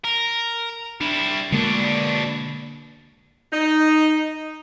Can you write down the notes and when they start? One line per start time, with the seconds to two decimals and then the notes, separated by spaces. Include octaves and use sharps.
0.04 A#4
1.01 G3 D4 E4
1.52 B2 D3 G#3 A#3 D4
3.53 D#4